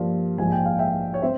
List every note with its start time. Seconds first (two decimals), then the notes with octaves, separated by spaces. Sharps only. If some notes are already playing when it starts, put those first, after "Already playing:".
Already playing: G2 F3 A#3
0.38 A#1 G#2 F3 G#5
0.52 G5
0.65 F5
0.79 E5 G5
1.14 C#5
1.22 C4 C5 E5